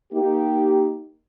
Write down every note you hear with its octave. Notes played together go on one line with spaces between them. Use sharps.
A#3 D#4 G4